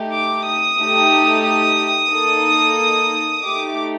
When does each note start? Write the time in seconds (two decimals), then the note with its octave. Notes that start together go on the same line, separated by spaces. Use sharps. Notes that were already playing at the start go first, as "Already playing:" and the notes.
Already playing: A3 D#4 G4
0.13 D6
0.47 D#6
0.79 A3 D#4 G4
1.45 D#6
2.12 A#3 D#4 A4
3.44 A3 D#4 G4 D6